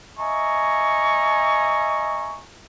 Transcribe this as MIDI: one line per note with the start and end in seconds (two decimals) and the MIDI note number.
0.18 2.42 75
0.18 2.42 76
0.18 2.42 80
0.18 2.42 82
0.18 2.42 85